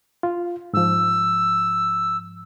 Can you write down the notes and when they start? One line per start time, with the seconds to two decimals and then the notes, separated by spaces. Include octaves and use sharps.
0.23 F4
0.73 G#2 F3 E6